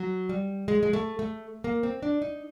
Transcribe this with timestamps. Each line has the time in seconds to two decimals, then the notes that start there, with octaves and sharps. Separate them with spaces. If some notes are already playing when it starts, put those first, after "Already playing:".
Already playing: F#3
0.29 G3
0.68 G#3
0.83 G#3
0.93 A3
1.19 A3
1.64 A#3
1.83 C4
2.03 D4
2.22 D#4